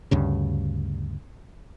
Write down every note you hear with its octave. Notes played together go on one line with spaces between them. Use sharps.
D2 G2 C#3